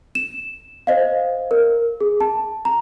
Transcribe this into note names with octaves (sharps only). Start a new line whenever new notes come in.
E7
C5 D#5 F5
A#4
G#4
A5
A#5